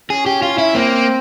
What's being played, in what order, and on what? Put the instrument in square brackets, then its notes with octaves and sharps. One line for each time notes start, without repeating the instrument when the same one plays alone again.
[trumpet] C#4 [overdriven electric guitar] G#4
[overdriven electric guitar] G4
F4
E4
[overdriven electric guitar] A#3 [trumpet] C4